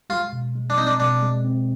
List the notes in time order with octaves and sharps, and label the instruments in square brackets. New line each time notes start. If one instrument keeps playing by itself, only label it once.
[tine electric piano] G#3 [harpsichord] F4
[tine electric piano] B2
G#3
[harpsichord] D4
[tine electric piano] C4 [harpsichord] D#4
[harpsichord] D4
[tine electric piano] B2 [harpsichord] D4
[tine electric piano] G#3
C4